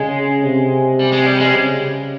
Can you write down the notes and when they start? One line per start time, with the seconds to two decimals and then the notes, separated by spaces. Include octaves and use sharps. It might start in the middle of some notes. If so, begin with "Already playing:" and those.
Already playing: C#3 G#3
0.44 C3
0.99 G3
1.12 G#3
1.26 G3
1.40 G#3
1.53 C#3